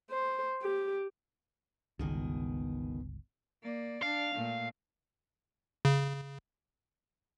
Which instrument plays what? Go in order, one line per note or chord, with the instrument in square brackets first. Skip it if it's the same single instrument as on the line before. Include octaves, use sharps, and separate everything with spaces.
[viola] C5
G4
[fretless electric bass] G1 C#2 [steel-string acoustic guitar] B2 D#3 G#4
[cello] A#3 D5
[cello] D4 [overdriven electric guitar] F5
[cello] A#2 A3
[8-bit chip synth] C#3